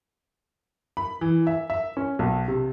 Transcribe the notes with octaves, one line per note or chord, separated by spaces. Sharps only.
B5
E3
E5
E5
C#4
B1
C3